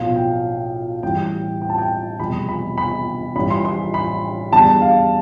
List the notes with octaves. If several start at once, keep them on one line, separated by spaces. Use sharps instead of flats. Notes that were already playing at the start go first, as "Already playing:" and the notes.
Already playing: B1 A2 F3 F5
G5
A1 A2 E3 G3 G5
G5
A5
G5
F1 E2 B2 G3 B5
B5
B5
A1 A2 E3 G3 B5
C6
C6
B5
E2 D3 G3 A5
F5